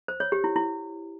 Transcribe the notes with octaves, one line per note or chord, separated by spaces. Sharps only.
C5
C#5
G4
E4
E4